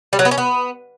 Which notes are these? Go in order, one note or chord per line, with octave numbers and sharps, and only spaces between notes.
G3
F#3
B3
C#4
B3